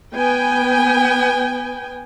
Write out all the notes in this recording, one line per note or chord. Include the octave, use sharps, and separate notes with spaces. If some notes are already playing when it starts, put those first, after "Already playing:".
B3 G5 G#5